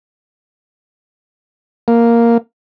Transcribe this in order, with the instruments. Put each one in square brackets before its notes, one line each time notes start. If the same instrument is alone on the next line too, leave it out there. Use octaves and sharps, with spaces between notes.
[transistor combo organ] A#3